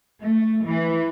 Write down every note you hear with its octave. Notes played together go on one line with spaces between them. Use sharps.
A3
E3